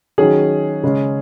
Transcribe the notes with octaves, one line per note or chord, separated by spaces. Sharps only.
D#3 F#3 C#4 G#4
C#3 G#3 C#4